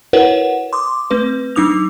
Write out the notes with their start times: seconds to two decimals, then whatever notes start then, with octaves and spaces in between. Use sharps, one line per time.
0.13 E4 F#4 A#4 B4 C#5 F#5
0.73 C6 D6 D#6
1.11 A3 C4 B4
1.56 F#3 D4 D#4 D6 D#6 F7